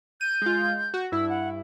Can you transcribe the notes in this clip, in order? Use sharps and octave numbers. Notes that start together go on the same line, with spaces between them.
G6 D#7
G#3 F4
F#4
G2 E4 E6
F#5